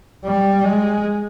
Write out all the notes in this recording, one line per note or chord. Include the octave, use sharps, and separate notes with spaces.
G3
G#3